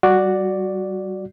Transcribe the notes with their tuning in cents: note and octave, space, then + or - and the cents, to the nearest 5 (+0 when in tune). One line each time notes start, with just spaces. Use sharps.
G3 -25 F#4 +0 D5 +0